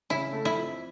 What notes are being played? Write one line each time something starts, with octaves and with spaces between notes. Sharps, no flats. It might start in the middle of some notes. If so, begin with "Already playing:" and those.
C#3 E4
A3
E4
F2